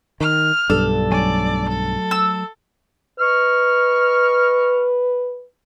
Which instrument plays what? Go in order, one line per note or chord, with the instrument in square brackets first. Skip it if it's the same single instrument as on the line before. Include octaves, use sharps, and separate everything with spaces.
[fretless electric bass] D#3 [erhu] F6
[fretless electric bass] B1 G2 [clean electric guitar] D4 [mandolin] A4
[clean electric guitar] F#3 A3 G#5 [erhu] D5
[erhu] A4
[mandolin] E6
[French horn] B4 [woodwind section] D#5 C#6 F6